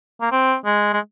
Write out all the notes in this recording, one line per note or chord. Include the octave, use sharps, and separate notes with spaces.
A#3
C4
G#3
G#3